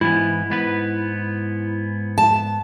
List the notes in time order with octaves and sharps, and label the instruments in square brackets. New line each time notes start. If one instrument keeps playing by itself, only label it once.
[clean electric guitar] G#2 E3 B3 [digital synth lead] E4
[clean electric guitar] G#2 B3 B4
[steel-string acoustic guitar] A5